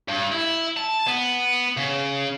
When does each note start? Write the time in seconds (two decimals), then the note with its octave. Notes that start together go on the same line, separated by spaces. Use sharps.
0.08 G2
0.32 E4
0.77 A5
1.07 B3
1.77 C#3